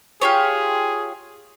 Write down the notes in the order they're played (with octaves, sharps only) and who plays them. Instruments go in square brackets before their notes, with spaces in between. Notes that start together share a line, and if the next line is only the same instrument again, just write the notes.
[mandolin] F4 G4 C#5 [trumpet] G#4